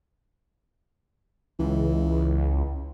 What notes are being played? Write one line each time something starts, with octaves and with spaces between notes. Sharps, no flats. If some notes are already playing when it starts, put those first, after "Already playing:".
C#2 E3